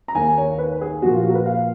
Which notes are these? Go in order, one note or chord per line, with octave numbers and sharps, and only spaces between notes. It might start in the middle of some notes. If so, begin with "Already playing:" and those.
A#5
D#2 D#3 A#3 G#5
C#5
B4
G#4
A#2 F3 A#3 F#4
F4
F#4
A#4
B4
F5